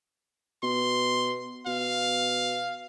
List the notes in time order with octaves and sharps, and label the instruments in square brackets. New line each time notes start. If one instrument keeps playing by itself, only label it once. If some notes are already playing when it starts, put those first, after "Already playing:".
[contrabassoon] B2 [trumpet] C6
[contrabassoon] B2 [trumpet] F5